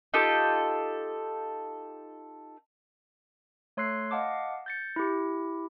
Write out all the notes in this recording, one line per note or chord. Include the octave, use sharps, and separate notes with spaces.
D#4 F4 G4 A4
A3 C#5 C6 E6 F#6 C7
D#5 F5 F#5 A5 D6
G6 A6 C#7
E4 G4